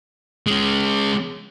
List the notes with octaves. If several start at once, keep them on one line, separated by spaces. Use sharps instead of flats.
G#3 C#4